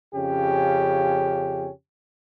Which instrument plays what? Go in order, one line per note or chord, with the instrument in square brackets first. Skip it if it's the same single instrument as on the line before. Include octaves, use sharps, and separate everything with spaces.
[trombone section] F2 C#3 C#4 G4